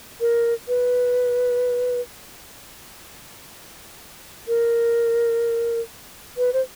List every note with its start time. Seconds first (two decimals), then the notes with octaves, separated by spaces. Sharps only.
0.21 A#4
0.68 B4
4.48 A#4
6.38 B4
6.53 C5